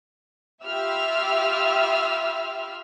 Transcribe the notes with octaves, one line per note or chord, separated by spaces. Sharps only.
F4 G4 E5 B5 E6 F6